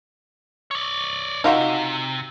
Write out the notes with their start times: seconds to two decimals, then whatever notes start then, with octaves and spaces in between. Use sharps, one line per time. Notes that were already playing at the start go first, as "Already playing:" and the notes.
0.71 C#5 D5
1.44 C3 D#4 F4 F#4